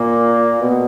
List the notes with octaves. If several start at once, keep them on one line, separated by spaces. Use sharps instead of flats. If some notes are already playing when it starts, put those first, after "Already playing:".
Already playing: A#2 A#3
B2 B3